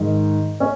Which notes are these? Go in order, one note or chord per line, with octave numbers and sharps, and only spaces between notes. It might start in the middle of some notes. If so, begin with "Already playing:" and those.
Already playing: G#2 D#3
C#4